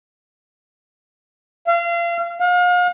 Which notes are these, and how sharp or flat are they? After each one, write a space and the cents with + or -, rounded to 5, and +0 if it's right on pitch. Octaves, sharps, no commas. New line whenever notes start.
F5 -30
F5 +40